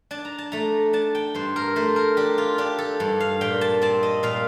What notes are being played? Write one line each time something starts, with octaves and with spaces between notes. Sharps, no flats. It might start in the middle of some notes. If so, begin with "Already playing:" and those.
D4 A5
A#5
A5
A3 A#5
D4 A5
G5
G2 C5
A#4
A3 C5
A#4
D4 G4
F4
D4 G4
A4
G2
F5
A#2 G5
A5
C4 A5
D#5
A#2 F5